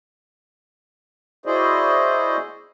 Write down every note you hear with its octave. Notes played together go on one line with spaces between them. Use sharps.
E4 F#4 G#4 C5 D5 D#5